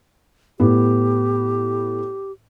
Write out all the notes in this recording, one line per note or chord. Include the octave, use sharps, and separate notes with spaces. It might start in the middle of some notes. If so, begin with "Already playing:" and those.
A2 B3 G4